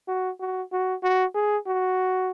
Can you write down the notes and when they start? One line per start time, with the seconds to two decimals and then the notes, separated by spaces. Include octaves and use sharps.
0.08 F#4
0.40 F#4
0.72 F#4
1.03 F#4
1.35 G#4
1.67 F#4